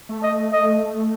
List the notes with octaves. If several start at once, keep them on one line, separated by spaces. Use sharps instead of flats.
A3
D#5
D#5